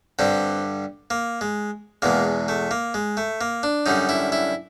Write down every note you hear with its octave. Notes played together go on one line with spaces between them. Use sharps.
G2 D3 G3 C4
A#3
G#3
E2 B2 G#3 A#3
A3
A#3
G#3
A3
A#3
D4
F#2 D3 G3 D#4
E4
E4